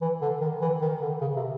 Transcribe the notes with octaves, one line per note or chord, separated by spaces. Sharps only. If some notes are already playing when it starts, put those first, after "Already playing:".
E3
D3
D#3
E3
D#3
D3
C#3
C3